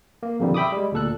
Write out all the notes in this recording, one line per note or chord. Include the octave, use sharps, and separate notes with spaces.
A#3
F2 B2 D3 D#3 F3 G3
E5 G5 B5 D6 D#6
G3 G#3
D2 A#2 A4 F#6